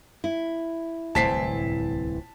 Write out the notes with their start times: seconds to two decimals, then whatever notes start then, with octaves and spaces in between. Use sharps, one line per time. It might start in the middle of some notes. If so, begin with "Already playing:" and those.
0.24 E4
1.15 D1 C2 A2 E3 C4 A5 B6 C7